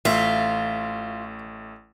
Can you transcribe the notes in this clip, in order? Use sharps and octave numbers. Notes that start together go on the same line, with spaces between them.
A1 A3 F4 B4 E5 F5